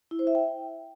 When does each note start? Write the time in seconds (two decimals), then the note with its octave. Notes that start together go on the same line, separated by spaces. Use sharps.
0.11 E4
0.19 C5
0.27 E5
0.35 G5